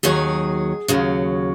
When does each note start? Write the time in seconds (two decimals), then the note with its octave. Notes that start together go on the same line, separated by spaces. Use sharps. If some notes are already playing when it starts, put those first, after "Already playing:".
0.03 D#2 D#3 F#3 G#4
0.88 D#2 C#3 F#3